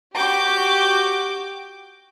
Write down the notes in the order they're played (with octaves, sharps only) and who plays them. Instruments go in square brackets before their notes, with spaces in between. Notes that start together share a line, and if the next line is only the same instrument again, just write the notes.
[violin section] F#4 G4 D6 G6